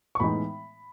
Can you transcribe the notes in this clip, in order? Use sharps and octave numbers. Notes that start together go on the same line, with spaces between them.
C#6
A2 E3 G#3 B3 D#4 B5